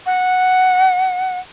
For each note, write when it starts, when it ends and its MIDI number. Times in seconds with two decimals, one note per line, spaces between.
0.06 1.39 78